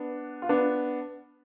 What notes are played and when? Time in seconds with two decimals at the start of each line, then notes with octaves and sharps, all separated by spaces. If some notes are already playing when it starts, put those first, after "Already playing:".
Already playing: B3 D4
0.42 F4
0.49 B3 D4